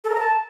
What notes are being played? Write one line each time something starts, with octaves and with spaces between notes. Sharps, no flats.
A4
A#4
A#5
A5